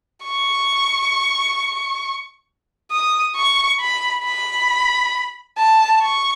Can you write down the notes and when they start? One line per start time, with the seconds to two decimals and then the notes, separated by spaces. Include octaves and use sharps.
0.25 C#6
2.91 D#6
3.36 C#6
3.80 B5
4.24 B5
5.58 A5
6.02 C#6